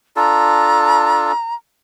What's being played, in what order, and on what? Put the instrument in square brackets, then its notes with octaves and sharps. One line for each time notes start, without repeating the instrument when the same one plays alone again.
[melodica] D4 F4 A4 [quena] A#5